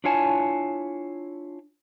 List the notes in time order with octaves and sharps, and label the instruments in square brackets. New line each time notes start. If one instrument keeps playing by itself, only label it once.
[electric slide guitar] D4 E4 F4 C#5 G#5 A5